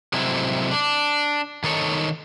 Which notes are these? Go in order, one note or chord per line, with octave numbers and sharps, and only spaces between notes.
C3 F#3 G#3 A3 C4 E4
D4
D#3 D#4 A4 C#5